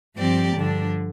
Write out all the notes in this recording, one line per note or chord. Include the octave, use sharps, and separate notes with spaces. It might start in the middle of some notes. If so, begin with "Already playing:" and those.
G2 F3 C4 G4 D5
G2 D3 F3 D4